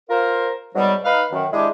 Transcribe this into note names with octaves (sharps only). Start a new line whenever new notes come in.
F4 A#4 C5
G#2 B2 F#3 G3
D#4 B4 F5
F#2 D#3
G#3 D4 E4 G4 G#4